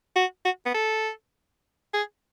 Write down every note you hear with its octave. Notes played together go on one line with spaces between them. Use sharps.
F#4
F#4
B3
A4
G#4